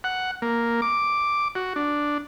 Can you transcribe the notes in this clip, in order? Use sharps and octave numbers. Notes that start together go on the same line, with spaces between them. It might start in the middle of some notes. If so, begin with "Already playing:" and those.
F#5
A#3
D6
F#4
D4